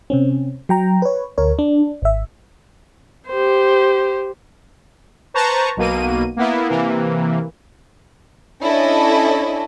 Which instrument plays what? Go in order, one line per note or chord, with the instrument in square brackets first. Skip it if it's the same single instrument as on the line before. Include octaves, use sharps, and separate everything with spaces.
[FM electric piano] C3 C4 C#4
F#3 G5 A#5
B4 C#5
D2 A#4 C#5
D4
G#1 E5
[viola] G4 C5
[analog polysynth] B4 C5 A5 A#5 C#6
B1 B2 A#3 D#7
A#3 B3 E4
C3 E3 A#3
[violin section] C#4 D4 E4 A4 D#5